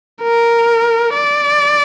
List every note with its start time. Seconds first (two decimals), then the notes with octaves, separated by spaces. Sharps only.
0.23 A#4
1.15 D5